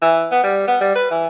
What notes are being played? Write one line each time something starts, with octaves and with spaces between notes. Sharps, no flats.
E3
B3
G3
B3
G3
B4
E3